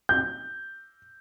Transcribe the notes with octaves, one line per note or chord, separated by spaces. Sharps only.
G6